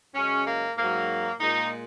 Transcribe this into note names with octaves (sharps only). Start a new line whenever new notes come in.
F#2 C#3 G#3 C#4
A#3
G#2 F#3 A#3
A#2 G#3 D#4